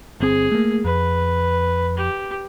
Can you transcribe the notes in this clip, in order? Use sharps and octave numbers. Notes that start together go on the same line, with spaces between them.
G1 C4 G#4
A3 A#3
F2 B4
G4